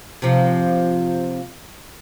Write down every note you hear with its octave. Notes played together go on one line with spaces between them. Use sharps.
C3 F3